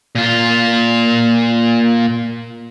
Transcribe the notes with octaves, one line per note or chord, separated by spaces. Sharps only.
A#2 F4